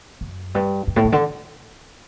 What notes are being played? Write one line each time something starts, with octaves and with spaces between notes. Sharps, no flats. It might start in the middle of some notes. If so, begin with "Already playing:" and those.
F#2
G2
F#2
A2
B2
D3